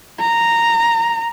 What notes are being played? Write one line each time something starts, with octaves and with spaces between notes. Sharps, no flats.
A#5